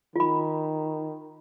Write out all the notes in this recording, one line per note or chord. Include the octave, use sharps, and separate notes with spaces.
D#3 F4 B5